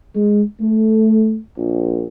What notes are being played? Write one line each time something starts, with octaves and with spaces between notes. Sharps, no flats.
G#3
A3
A#1